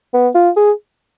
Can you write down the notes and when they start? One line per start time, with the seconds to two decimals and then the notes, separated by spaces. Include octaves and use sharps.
0.14 B3
0.35 F4
0.56 G#4